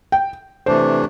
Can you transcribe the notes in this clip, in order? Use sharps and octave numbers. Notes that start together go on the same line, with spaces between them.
G5
C3 E3 A3 D4 C5